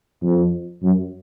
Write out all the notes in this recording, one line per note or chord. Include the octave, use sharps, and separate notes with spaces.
F2
F#2